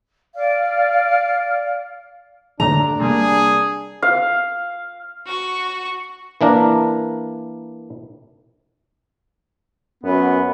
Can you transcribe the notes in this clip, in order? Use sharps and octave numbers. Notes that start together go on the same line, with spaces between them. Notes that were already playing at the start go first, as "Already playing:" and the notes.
D5 F5
F#2 D3 A3 D4 A#5
C3 G3 A#3 G#4
F5
F#4 C#6
E3 A#3 D4 A#4
F#2 B3